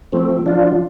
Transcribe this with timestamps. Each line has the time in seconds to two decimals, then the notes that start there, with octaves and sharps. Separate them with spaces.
0.12 F3 A3 C4
0.46 F3 D4 F4